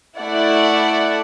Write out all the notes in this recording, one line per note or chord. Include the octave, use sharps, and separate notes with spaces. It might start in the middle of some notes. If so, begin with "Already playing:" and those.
A3 E4 D5 F#5